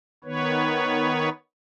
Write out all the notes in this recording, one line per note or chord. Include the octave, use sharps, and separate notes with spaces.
D#3 B3 B4 C#5